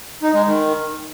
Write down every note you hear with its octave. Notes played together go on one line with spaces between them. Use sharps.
D#4
G#3
D#3